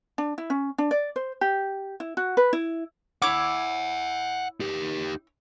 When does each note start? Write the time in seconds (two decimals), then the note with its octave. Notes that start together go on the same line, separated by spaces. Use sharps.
0.18 D4
0.38 E4
0.50 C#4
0.78 D4
0.91 D5
1.16 C5
1.41 G4
2.00 E4
2.17 F#4
2.37 B4
2.53 E4
3.22 E4 C#5 E5 F#5 D6
4.60 D#4 G4